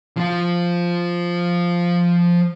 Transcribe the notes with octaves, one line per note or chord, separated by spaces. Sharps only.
F3 F4